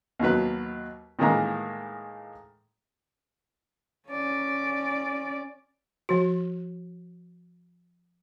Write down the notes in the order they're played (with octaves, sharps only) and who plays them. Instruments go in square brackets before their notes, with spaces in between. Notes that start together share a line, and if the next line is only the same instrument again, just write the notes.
[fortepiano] D#2 B2 F#3 B4
A2 D#3 E3 G#3 A#3 A#5
[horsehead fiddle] C#4 D5
[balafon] F3 F#4